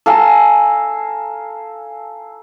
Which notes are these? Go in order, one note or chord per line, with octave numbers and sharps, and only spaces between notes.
A4 F5 G#5 A#5